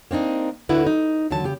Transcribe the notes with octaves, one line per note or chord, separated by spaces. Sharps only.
A#3 C4 D4 D#4
D2 D3 E4 F#4 B4
D#4
D#2 D3 F#3 A5
C#3 G4